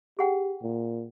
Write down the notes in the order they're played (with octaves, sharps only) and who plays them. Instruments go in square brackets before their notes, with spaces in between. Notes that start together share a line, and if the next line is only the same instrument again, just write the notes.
[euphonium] G4 [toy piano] G#4 F#5 G5
[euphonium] A#2